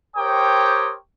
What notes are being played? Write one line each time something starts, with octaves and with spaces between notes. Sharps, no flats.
G4 A#4 C5 C#5 G5 D#6